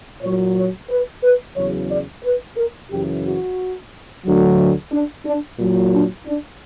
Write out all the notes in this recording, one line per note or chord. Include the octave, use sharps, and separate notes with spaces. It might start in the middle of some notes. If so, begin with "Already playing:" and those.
A#2 F#3 C#5
C#5
B4
B4
E2 C#3 F#3 C#5
D5
B4
A#4
F#2 C#3 E3 G4
F#4
D2 D3 F#3
D4
D4
A#2 F#3
D4
D4